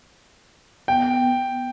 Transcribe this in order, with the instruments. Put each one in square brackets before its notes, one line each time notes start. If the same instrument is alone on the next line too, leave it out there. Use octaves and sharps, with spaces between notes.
[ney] B3 [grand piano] G5